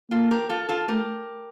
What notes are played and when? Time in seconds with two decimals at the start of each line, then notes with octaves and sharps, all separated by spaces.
0.11 A#3 F4 A4
0.31 G4 A#4
0.49 F4 A4
0.69 F4 A4
0.88 A3 G4 A#4